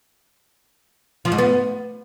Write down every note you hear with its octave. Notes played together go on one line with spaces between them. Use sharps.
F3
G#2
B3